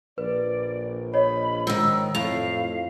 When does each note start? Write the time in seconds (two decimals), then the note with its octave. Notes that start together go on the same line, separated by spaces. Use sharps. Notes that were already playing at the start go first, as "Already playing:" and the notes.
0.18 A#1 B4 D5
1.14 C#5 D#5 B5
1.67 G#2 D#3 E6
2.15 F2 A2 F5 F7